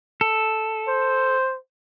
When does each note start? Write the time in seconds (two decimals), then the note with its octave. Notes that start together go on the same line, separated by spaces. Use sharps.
0.21 A4
0.88 C5